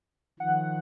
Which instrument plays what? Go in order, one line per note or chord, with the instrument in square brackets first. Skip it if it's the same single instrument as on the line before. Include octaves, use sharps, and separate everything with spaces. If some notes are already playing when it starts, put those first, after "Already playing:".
[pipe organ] D#3 F3 [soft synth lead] F#5